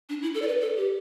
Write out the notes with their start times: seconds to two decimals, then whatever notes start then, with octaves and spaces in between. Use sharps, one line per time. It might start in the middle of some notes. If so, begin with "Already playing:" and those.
0.09 D4
0.22 E4
0.35 A4
0.42 D5
0.48 B4
0.61 A4
0.76 G4